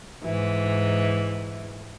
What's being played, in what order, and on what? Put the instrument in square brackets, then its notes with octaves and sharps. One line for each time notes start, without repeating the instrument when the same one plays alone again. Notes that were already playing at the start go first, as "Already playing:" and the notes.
[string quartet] G#2 E3